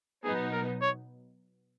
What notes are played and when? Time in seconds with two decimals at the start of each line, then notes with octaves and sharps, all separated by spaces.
0.24 B2 F#3 B3 D#4 G#4
0.53 A#4
0.82 C#5